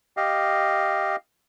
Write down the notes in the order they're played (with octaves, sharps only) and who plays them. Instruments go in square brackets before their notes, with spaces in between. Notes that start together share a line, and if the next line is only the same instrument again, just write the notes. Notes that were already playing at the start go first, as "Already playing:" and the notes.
[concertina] G4 D#5 F5